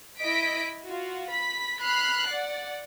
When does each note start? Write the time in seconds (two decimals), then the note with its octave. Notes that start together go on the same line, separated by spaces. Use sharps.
0.20 E4 D#5 B6 D7
0.84 F4 F#4
1.30 B5 B6
1.80 B5 F6 F#6 C7
2.26 D5 F#5